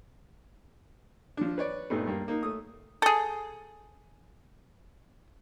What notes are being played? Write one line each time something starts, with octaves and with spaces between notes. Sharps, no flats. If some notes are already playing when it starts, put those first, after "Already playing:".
F3 D4
B4 C#5 D5
G2 A#2 G3 A3 B3 D#4
G2 A#3
A#3 D#4
A3 D#6
G#4 A4